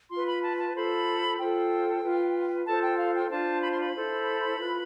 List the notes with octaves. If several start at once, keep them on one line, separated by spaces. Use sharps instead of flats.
F4 B4 C6
B5
A5
A5
F4 A4 C5 B5
F4 A4 C5 G5
F4 B4
F4 A4 C5 A5
G5
F5
G5
D4 F4 C5 A5
B5
C6
B5
E4 A4 C5
F4 B4